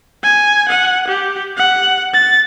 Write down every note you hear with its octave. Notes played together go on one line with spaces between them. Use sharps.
G#5
F#5
G4
F#5
A6